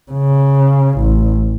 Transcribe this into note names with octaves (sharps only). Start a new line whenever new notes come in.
C#3
A1